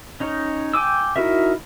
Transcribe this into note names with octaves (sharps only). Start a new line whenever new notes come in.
C#4 D#4 C#5
G5 G#5 D6 E6
D#4 E4 F#4 A#4 E5